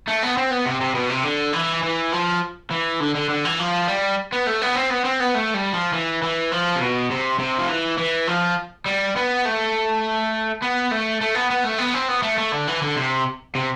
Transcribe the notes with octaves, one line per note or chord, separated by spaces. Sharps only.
A3
B3
C4
B3
C3
C3
B2
C3
D3
E3
E3
F3
E3
D3
D3
D3
E3
F3
G3
B3
A3
B3
C4
B3
C4
B3
A3
G3
F3
E3
E3
F3
C3
B2
C3
C3
F3
E3
E3
F3
G3
B3
A3
B3
A3
A3
B3
B3
A3
B3
C4
B3
A3
A3
D3
E3
D3
C3
C3